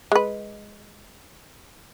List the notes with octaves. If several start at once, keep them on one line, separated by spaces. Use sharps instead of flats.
G#3 B4